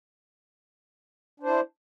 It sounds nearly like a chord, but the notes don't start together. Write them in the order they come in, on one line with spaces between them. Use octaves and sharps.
D4 C5 E4